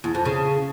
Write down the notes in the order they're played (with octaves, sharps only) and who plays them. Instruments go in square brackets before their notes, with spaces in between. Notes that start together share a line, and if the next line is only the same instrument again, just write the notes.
[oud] E2
F2
C#3